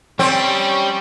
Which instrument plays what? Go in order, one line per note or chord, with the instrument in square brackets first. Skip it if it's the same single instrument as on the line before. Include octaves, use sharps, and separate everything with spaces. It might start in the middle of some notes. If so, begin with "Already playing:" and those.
[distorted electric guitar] G3 [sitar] C4 [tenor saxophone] C#4